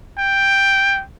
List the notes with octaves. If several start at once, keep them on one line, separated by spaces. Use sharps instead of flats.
G5